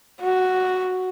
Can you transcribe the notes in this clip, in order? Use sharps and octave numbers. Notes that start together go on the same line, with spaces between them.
F#4